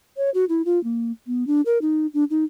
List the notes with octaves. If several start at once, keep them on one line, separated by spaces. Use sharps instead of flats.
C#5
F#4
E4
F4
A#3
B3
D4
A#4
D#4
D4
D#4